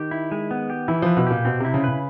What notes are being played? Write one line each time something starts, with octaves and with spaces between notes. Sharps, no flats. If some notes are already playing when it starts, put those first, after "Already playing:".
Already playing: D#3 G4
E4
G#3
B3
G4
E3 E4
F3 B4
B2
A#2 G4
B2 C4
C3 E4
C#3
C#3 B4